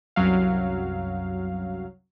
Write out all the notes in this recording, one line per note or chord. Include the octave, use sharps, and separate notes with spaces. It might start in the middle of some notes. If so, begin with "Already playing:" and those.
C2 F#2 F#3 F5